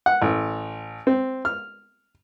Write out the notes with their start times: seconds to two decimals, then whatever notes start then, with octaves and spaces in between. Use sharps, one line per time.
0.06 F#5
0.22 A1
1.07 C4
1.45 F6